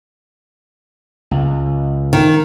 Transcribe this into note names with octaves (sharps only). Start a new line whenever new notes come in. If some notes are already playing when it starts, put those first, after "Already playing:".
C#2
D#3